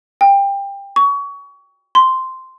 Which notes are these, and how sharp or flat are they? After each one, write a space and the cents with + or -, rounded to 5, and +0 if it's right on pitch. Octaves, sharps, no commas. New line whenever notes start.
G5 +20
C#6 +25
C6 -5